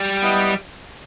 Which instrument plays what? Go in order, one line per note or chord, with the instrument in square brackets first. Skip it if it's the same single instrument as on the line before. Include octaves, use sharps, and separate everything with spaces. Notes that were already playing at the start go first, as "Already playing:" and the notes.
Already playing: [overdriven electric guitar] G3
[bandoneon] B3 E4 B4 D#5